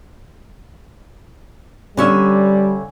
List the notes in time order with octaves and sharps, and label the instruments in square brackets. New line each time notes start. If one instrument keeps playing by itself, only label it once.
[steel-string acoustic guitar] D3 C#4 E5 [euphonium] G3